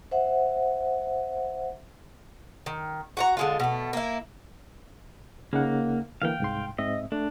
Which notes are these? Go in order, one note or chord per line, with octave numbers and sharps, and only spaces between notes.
C5 E5 F#5
D#3
F#4 F#5 A#5
D3 G#3 F4
B2 A3
A#3 E4
C#3 A#3 D#4 F#5
D3 E3 A#3 F5 G5
C2 G#2 C6
G#2 C4 D#5 E5
A3 D4